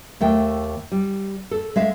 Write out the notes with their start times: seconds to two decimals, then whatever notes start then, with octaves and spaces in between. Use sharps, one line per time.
0.21 D#2 A3 G5
0.92 G3
1.51 A4
1.76 G#3 E5 F5